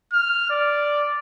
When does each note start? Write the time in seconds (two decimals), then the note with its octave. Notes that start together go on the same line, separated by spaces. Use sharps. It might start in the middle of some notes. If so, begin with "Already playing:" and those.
0.13 F6
0.50 D5